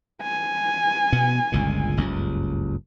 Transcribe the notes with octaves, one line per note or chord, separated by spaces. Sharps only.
G#5
B2 B3
G1 C#2 A#2
F#1 C#2 G2